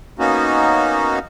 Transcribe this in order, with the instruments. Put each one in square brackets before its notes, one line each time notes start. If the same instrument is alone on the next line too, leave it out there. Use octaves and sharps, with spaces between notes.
[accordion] A#3 B3 C#4 D#4 F#4